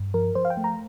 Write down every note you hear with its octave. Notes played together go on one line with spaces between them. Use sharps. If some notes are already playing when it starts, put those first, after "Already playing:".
Already playing: G2
F3 A#4
F3 C5
F5
G5
A3
A#5